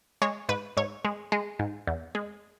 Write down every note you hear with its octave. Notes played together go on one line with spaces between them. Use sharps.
G#3 C#5
G#2 B4
G#2 C#5
G#3
G#3
G#2
E2
G#3